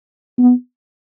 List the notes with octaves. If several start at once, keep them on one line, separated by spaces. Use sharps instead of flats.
B3